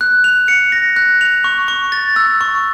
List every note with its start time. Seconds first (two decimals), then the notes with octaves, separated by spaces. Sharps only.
0.01 F#6
0.24 F7
0.48 C#7
0.72 A#6
0.96 F#6
1.21 F7
1.44 C#6
1.68 C#6
1.92 A6
2.16 E6
2.41 C#6